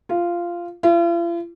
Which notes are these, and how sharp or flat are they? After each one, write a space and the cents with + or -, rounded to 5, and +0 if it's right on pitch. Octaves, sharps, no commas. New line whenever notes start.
F4 -10
F4 -45